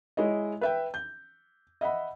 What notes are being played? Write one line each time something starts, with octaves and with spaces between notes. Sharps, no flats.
G#3 E4 C#5 D#5
B4 E5 G5
G6
D#5 E5 F#5 B5